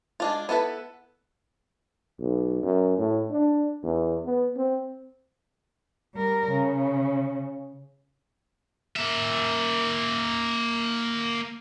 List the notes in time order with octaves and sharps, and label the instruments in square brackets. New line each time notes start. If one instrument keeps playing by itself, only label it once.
[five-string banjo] G#3 D4 F4
B3 E4 A4 B4
[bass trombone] B1
F#2
A2
D4
E2
B3
C4
[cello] G3 A#4
C#3
[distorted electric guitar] A#3 E5